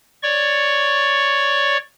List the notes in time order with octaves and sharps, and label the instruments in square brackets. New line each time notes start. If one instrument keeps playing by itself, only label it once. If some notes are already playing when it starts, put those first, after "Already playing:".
[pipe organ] C#5 D5 C#6